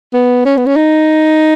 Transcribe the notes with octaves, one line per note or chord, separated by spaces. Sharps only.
B3
C#4
B3
C#4
D#4